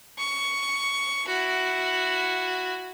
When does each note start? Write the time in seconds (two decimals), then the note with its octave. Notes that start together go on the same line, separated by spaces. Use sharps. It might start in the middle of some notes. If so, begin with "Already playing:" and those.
0.19 C#6
1.26 E4 F#4